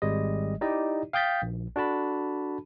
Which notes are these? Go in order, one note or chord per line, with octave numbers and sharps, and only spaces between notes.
G#1 G3 G#3 D#5
D#4 E4 G4 D5 D#5
F5 G5 D#6 G6 A6 B6
A#1
D4 F#4 A4 A5 B5